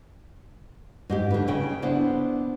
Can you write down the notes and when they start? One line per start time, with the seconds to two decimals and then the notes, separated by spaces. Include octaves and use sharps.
1.10 G#2 D#4 G4
1.31 D3 B4
1.47 A2 C#3 G5
1.82 B3 D4 E4 C5